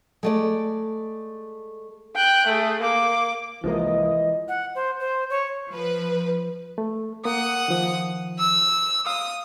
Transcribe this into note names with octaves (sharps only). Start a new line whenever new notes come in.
G#3 A3 D5
G5 F#6
A3 G#4
A#3 D6
C2 E3 F3 G#3 A#3 D#5
F#5
C5
C5
C#5
F3 B4
A3
A#3 F#5 D#6
D#3 F3
E6
F5 D#6